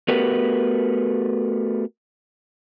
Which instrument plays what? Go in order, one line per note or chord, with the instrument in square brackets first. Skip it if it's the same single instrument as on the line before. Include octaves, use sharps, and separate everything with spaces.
[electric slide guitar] A3 B3 F#4 G4 A#4 B4